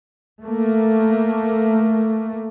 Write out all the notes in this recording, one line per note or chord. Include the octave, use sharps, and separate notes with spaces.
A3 A#3